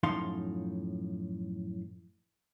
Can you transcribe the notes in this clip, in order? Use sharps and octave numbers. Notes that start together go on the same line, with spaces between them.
F#2 A2 F3 D#4 F5 C6